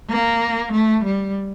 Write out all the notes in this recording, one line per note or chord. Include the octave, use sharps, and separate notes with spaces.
A#3
A3
G3